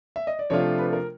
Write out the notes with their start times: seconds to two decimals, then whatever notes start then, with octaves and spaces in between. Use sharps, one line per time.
0.16 E5
0.27 D#5
0.39 D5
0.50 C3 F3 A3 D4 F4 C#5
0.78 B4
0.93 A#4